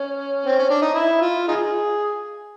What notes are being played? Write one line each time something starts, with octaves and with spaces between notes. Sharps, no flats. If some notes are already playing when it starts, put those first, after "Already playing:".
Already playing: C#4
C4
C#4
D4
D#4
E4
F4
D#4 F4 G#4